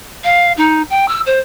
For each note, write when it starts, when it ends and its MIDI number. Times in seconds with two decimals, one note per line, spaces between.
0.24 0.52 77
0.57 0.82 63
0.90 1.08 79
1.08 1.20 88
1.26 1.39 72